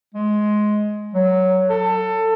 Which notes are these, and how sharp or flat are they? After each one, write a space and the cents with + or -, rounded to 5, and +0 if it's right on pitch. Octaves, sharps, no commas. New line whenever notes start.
G#3 +15
F#3 +5
A4 +20